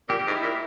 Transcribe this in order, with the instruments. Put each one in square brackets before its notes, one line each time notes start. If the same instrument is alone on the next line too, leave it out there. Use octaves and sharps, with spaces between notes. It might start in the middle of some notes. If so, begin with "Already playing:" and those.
[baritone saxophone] A#2 [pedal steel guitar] G4
[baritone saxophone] G#2
[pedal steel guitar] E4
[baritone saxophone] A#2